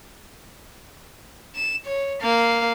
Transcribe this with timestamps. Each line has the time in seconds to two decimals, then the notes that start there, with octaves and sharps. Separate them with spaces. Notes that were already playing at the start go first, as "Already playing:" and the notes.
1.55 E7
1.86 C#5
2.22 A#3 F5